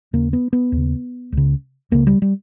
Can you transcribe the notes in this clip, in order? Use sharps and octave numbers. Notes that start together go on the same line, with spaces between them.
D#2 C#3 A#3
B3
B3
D#2
C#3
C#2 C#3
C#2 C#3 A#3
G3
G3